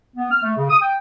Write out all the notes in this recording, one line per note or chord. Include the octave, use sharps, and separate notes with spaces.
B3
F6
A3
C#3
D#6
G5